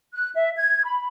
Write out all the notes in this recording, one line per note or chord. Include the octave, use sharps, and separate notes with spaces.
F#6
E5
G#6
B5